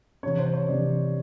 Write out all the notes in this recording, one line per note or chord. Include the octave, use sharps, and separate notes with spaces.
C3 E3 C#5
C5
C#5
C3 E3 D5